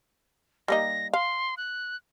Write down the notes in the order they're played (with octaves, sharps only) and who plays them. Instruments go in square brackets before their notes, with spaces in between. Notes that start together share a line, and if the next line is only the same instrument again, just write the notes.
[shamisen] G3 A#3 D#4 [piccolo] A#6
[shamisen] F5 [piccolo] C6
[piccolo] F#6